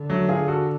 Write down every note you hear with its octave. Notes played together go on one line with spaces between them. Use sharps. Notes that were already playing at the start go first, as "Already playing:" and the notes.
Already playing: D3
F#3 A3
F4 G#4
F#4 A4